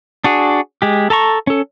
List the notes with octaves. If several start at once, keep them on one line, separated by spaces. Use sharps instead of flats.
D4 F#4 G#4
G#3 G4
A4 A5 A#5 C#6
C#4 A4